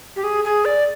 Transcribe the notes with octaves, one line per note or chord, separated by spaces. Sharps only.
G4
G#4
G#4
D5